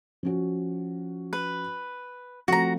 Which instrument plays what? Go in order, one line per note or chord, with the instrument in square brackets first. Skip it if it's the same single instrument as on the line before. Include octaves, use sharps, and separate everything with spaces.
[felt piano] F3 C#4 F#4
[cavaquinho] B4
[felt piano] F3 A3 C4 [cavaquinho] F#4 A#5